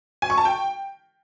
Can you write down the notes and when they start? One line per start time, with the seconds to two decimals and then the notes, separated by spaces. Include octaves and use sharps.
0.22 G#5
0.30 C#6
0.38 A5
0.45 G5